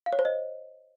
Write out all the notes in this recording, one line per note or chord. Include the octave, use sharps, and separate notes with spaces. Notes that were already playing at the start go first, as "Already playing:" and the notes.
F5
C#5
C5
D#5